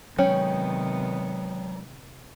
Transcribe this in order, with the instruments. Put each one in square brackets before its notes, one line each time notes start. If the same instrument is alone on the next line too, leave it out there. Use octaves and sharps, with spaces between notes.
[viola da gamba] C3 D#3 B3 [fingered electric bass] F#3 G#3 [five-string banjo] C#4 [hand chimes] C#5 G5